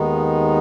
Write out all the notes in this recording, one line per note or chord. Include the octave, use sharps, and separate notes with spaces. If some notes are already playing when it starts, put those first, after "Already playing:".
Already playing: D#2 D#3 G#3 B3 D#4